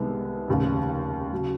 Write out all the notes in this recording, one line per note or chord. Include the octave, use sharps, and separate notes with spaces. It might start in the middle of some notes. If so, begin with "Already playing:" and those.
Already playing: C2 C3 D#3 G#3 B3
F1 D#2 C#3
C#3 F#3